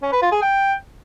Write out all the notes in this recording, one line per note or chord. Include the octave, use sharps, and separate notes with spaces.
C#4
B4
F4
G#4
G5